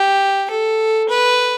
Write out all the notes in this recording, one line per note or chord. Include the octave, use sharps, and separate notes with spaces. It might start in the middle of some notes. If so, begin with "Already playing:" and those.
Already playing: G4
A4
B4